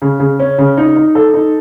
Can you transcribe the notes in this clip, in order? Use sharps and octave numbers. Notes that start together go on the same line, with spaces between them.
C#3
C#3
C#4
C#3
D#4
D#4
A4
D#4